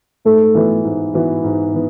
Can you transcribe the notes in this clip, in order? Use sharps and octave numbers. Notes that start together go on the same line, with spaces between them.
G#2 A3 A4
E3 B3 F#4 B4
G#2
E3 B3 F#4 B4
G#2
E3 B3